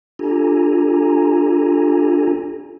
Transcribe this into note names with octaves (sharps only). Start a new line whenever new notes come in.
D4 F4 G4 A4 G#5 A#5